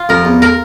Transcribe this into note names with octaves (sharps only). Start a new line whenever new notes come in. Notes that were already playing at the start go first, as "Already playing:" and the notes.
Already playing: F4
F2 A#4
E2
A#4